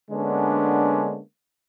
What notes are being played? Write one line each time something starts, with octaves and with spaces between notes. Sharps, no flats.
D3 G#3 A#3 B3 C#4 D4